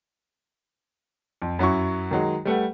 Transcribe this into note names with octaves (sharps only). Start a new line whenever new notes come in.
F2
F#2 F#3 E4 C#6
D#3 F#3 G#3
G3 A3 B4 F#5